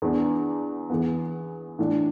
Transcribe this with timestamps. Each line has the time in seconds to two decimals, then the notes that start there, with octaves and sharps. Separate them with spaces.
0.02 E2 E3 B3 D4
0.90 E2 E3 B3
1.79 A2 E3 D4